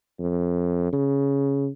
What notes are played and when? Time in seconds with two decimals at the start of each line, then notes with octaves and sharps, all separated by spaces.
0.20 F2
0.93 C#3